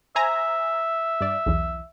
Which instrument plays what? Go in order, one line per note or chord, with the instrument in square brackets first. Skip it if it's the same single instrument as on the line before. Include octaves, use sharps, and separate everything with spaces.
[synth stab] C5 G#5 A#5 [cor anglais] E5
[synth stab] G2 D5
B1 E2